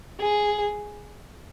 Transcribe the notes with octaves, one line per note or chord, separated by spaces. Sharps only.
G#4